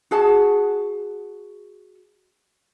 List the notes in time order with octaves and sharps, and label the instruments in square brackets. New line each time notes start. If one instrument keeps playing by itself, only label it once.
[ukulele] F#4 G#4 A5